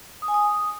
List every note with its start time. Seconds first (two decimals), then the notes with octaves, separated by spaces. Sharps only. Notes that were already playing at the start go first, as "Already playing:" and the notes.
0.22 D#6
0.28 G#5
0.34 D#6